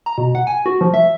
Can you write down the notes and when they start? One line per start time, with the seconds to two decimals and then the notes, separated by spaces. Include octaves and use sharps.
0.06 A#5
0.18 B2
0.35 F#5
0.47 G#5
0.66 F#4
0.81 F3
0.94 E5